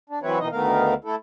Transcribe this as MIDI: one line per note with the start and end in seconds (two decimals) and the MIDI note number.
0.10 0.19 62
0.22 0.39 52
0.22 0.39 54
0.22 0.39 60
0.22 0.39 64
0.22 0.39 71
0.22 0.39 73
0.39 0.48 47
0.39 0.48 51
0.39 0.48 52
0.39 0.48 63
0.39 0.48 75
0.52 0.94 38
0.52 0.94 51
0.52 0.94 57
0.52 0.94 59
0.52 0.94 70
0.52 0.94 77
1.04 1.15 57
1.04 1.15 64
1.04 1.15 69